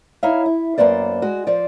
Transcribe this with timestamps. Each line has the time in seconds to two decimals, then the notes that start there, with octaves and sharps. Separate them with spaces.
0.23 D#4 E4 C#5 E5 F5
0.46 E4
0.78 F#2 A#3 B3 C5 D5
1.22 G#3 F#4
1.47 F3 C5 D5